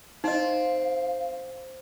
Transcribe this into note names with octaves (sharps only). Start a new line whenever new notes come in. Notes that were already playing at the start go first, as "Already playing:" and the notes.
C4 D#4 D#5 F5